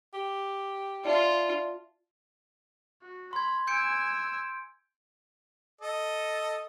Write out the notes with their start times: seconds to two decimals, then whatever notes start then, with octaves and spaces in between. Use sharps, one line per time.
0.14 G4
1.05 F4 D5 E5 A5
3.03 F#4
3.33 B5 C6 G#6
3.67 G#5 E6 G6 C#7 D7
5.81 A4 D#5